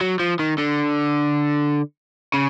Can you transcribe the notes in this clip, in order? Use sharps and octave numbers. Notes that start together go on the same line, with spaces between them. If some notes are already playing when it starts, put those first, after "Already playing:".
F#3
F3
D#3
D3
C#3